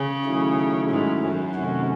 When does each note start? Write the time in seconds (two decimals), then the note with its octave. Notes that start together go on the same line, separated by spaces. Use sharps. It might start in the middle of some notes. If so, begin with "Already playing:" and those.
Already playing: C#3
0.25 D#3 F#3 A3 C#4 E4
0.90 G#2
1.23 F#2
1.55 C3 D#3 A3 C#4 F#4